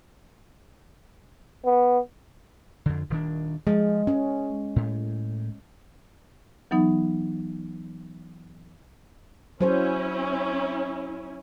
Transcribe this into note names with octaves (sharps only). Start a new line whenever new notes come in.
B3
F2 D3
D#1 D#3 D4
F3 G#3
G#3 C#4
A2
E3 F#3 B3 D#4
F#3 C#4 E4 C5